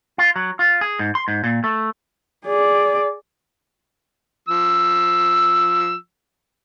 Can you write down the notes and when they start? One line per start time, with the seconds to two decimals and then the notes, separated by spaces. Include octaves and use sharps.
0.18 F4
0.36 F#3
0.59 F4
0.81 G#4
0.99 G#2
1.15 C6
1.28 G#2
1.44 A#2
1.64 A3
2.46 G#4 D5
4.48 F3 E6